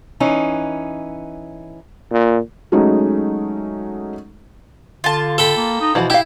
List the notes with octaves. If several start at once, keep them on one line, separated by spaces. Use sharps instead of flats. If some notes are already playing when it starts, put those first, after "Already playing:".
E3 C#4 D#4
A#2
F#3 G#3 A3 C#4 D#4
D3 F4 A5
A4 G5 B5
A#3
D#4
B2 E3 F3 F#4
E4 G4 F5